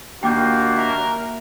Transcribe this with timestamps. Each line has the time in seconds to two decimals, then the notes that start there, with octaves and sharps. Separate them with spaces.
0.23 D#2 A#3 D4 F4 F#4 G5 D6 G6
0.77 A#4 E5